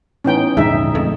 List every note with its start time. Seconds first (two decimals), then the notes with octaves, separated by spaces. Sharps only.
0.24 A2 E3 B3 C#4 D#4 G5
0.57 A#1 E2 G#2 D3 D#4 G#4 E5
0.95 F2 A3